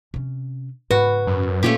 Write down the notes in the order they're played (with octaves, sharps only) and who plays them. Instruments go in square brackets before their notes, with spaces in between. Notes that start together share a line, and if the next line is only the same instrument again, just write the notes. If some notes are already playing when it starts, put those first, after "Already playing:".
[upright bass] C3 C#4
[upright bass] G#2 C#3 [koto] F#4 [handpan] B4
[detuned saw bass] F#2
[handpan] A#2 A#3 F4 [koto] A3 C#4 G4